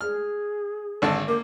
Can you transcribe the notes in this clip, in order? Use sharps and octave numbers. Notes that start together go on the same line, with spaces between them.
G#4 F6
G#1 D3 A5
A#3 D6